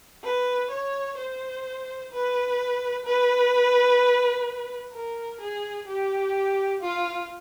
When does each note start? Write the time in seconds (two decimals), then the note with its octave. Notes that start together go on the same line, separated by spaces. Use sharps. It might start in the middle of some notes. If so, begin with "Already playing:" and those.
0.24 B4
0.70 C#5
1.18 C5
2.12 B4
3.05 B4
4.93 A#4
5.41 G#4
5.87 G4
6.81 F4